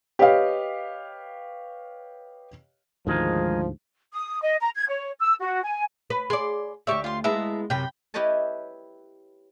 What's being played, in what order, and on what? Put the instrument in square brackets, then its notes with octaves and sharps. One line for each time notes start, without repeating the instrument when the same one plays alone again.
[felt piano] G4 B4 C#5 D#5 F5 G5
[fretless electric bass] D2 G#2 [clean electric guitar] D#3 G#3 D#4 [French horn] F3
[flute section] D#6
D#5
A#5
G#6
C#5
E6
F#4
G#5
[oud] B4
[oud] G#4 D5 [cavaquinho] C6
[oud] D2 G4 D5 [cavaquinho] E5 C#6
[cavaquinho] F4 C6
[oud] G#3 B3 E4 [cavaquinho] E5 A5 A#5
[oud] F#2 C3 [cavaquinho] G5 B5
[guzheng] E4 G4 B4 C#5 D#5 A5